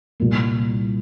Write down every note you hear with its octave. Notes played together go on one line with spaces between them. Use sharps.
C2 A#2 G3 A#3